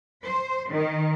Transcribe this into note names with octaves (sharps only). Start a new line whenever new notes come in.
C5
D#3